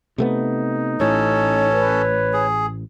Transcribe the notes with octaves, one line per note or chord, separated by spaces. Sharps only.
C3 A3 B3 D#4
A1 A2 C#4 A4 C#5
B4
G#4